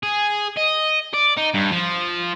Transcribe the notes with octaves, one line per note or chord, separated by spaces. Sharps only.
G#4
D#5
D5
D#4
G2
F3